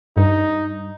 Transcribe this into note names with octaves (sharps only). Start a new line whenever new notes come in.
G2 D#4